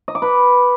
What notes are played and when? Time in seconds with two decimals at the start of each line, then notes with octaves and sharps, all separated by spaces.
0.08 D#5
0.15 D6
0.22 B4